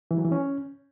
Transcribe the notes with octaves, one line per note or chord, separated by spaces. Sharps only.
E3
F#3
E3
C#4